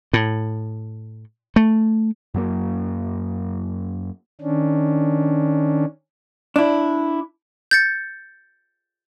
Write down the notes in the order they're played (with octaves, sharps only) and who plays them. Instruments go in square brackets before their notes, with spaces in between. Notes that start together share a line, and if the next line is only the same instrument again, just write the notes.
[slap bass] A2
A3
[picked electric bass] F#2 F#3 A3 A#3
[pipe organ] D#3 C#4 D4
[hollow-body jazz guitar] D4 E4
[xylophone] G6 A6 C#7